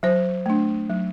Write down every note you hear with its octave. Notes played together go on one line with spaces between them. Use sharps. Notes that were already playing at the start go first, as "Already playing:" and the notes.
F#3 C5
A3 D4
F#3